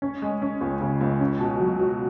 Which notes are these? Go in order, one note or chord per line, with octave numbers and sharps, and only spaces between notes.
C#4
G#3
C#4
C#2
C#3
C#2
C#4
B2
F#3
F#4